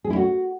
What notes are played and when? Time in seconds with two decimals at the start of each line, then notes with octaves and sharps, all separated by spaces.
0.04 G#4
0.10 E4
0.16 F#4